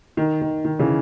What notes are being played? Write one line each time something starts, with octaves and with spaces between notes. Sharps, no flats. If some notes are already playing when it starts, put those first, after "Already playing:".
D#3
D#3
D#3
C#3 E3